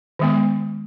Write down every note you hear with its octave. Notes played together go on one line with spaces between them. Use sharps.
D#3 G#3 B3